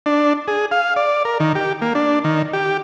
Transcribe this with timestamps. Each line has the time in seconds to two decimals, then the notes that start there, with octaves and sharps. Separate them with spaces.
0.06 D4
0.48 G#4
0.71 F5
0.96 D5
1.25 A#4
1.40 D#3
1.55 G4
1.82 A#3
1.95 D4
2.24 D#3
2.53 G4